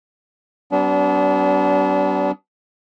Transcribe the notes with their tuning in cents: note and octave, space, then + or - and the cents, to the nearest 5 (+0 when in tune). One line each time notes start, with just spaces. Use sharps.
G3 -45 B3 +25 D4 -30